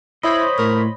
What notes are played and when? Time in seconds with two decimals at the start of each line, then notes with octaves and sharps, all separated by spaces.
0.23 E4 C5 C#5 D#5 B5
0.58 A2 A#4